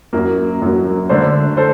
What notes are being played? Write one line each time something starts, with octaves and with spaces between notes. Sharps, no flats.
F#2 F#3 A#3
F#2 F#3 A#3
D3 A3 D4 A4 C5
A4 C5